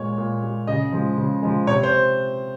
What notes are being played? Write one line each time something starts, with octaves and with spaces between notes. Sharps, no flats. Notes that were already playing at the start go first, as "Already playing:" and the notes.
Already playing: A#2 G#3 C#5
A#2
G#3
C#3 D#5
F3 G#3
C#3
F3 G#3
C3 C#5
C5